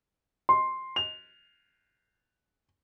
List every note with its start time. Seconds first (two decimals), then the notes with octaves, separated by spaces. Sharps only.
0.49 C6
0.96 F7